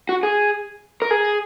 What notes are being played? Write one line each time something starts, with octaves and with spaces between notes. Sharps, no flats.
F#4
G#4
A#4
G#4